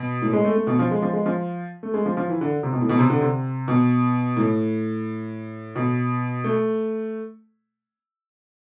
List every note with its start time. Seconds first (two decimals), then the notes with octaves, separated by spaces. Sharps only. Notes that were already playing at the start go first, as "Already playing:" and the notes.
Already playing: B2
0.22 A2
0.33 G#3
0.44 A3
0.55 A3
0.67 B2
0.79 F3
0.91 G#3
1.02 F3
1.13 G#3
1.26 F3
1.83 A3
1.94 G#3
2.06 F3
2.17 F3
2.29 E3
2.41 D3
2.63 C3
2.73 B2
2.81 A2
2.89 B2
2.98 C3
3.10 D3
3.21 C3
3.68 B2
4.37 A2
5.76 B2
6.44 A3